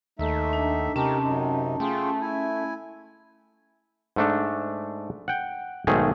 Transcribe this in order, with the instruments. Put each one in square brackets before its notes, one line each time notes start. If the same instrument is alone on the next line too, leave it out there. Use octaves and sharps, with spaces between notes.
[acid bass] D#2 [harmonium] A3 D#4 E5
[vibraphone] D4
[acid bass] C3 [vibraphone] C#4 A5 [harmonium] D#4 G4 A#4
[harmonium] F#2 D#4
[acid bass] A3 [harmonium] F4 G#4 G5
[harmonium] E4 G#5
[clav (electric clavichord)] G#2 A3 D4
F#5 G5
B1 G#2 D#3 A3 G#4